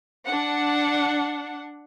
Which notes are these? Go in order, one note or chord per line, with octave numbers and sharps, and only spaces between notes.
D4 F#5